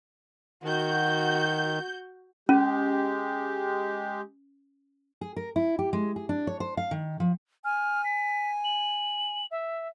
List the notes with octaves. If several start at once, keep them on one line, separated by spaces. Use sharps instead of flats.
D#3 F#4 G6
G#3 C#4 G4
G#4
A#4
E4
G4
G#3
G#4
D4
C#5
C5
F5
D#3
F3
G#5 F6
B6
F#7
E5